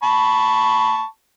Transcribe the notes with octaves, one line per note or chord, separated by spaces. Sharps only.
A5 B5 C#6